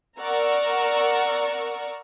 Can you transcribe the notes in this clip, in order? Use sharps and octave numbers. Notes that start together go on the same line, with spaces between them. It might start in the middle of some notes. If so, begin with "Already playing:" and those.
A#4 D5 F#5 A#5 C#6 E6